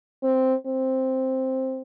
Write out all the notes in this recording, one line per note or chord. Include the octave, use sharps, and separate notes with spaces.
C4
C4